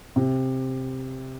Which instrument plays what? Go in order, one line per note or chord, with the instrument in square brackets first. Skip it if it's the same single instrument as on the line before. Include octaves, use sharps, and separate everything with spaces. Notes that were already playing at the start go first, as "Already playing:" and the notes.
[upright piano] C3